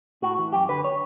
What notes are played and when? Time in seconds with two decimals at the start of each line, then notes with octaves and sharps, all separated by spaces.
0.22 A2 F#4
0.38 E3
0.53 F#2 G4
0.68 D3 B4
0.84 C#5